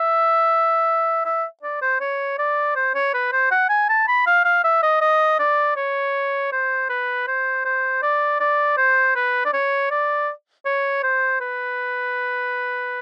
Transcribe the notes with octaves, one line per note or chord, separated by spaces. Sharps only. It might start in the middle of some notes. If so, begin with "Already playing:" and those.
Already playing: E5
E5
D5
C5
C#5
D5
C5
C#5
B4
C5
F#5
G#5
A5
B5
F5
F5
E5
D#5
D#5
D5
C#5
C5
B4
C5
C5
D5
D5
C5
B4
D5
C#5
D5
C#5
C5
B4